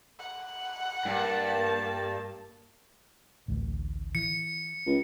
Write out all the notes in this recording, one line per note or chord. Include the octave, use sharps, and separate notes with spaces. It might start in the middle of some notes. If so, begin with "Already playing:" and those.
F#5
G2 A#3 A5
A1 D2
E3 C#7
C#2